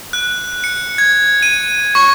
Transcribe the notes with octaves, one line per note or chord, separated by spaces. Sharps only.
F#6
C#7
G#6
D#7
C#6